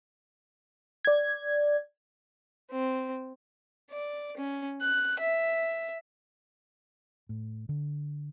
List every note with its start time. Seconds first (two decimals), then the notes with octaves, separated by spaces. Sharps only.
1.05 D5 G#6
2.72 C4
3.91 D5
4.37 C#4
4.81 F#6
5.19 E5
7.29 A2
7.69 D3